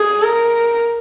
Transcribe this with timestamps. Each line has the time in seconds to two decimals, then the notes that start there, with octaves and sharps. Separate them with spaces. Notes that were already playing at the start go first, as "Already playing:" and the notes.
Already playing: G#4
0.23 A#4